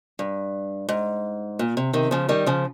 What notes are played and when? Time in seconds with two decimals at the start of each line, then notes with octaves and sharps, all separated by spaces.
0.19 G2
0.89 G#2
1.59 A#2
1.77 C3
1.93 C3 D#3
2.11 C#3 F3
2.29 D#3 G3
2.46 C#3 F3